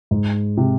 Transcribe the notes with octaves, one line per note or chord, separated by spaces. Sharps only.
G#2
C3